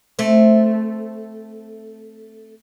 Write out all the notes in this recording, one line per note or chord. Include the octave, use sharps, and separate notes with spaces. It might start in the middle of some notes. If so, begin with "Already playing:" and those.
A3 C4